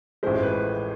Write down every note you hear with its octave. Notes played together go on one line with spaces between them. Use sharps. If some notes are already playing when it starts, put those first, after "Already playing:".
A1 A2 F3 G#3 C5
C5
B4